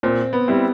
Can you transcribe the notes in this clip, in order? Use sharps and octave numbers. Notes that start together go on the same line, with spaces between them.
A#2 C4
B3
G3 C4 E4